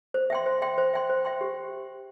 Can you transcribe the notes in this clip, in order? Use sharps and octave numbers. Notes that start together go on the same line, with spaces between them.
C5
E5 G5 C6
C5
E5 G5 C6
C5
E5 G5 C6
C5
E5 G5 C6
G4